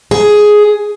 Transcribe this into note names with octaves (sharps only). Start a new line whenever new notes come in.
G#4